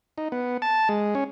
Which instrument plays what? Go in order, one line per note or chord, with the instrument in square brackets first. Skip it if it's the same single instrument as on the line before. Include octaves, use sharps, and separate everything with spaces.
[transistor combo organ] D#4
B3
A5
G#3
C#4